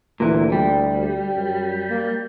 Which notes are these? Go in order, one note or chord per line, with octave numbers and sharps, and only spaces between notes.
D2 A#2 E3
G3
F#2
A#3